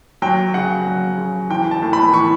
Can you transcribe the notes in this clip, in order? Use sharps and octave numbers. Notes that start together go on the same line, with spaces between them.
F#3 G5
C#3 F#5
F#3
C#3
E3 G5
A5
A2
B5
E3 C#6